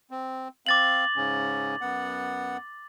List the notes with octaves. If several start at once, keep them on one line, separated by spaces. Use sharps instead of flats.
C4
C4 F5 D6 A6 F#7
G#2 C#3 C#4
F#2 B3 F#5